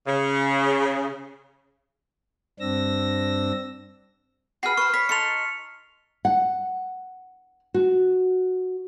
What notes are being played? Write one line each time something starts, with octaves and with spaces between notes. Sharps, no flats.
C#3
G2 C4 D4 E6 A#6
F#4 G#4 B4 F6 C7
B4 C5 C#6 F6
C#5 B6
D#4 A4 C6 C#7 F7
F#5
F#4